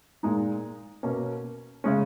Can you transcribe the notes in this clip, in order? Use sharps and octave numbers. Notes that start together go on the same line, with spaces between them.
A#2 G#3 D#4
B2 A#3 C#4
C#3 G#3 C#4